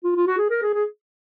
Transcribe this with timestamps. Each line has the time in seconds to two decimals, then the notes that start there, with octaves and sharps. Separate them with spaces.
0.04 F4
0.16 F4
0.27 F#4
0.38 G#4
0.50 A#4
0.62 G#4
0.74 G#4